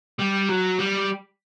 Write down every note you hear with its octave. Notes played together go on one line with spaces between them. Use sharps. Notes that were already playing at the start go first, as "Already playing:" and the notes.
G3
F#3
G3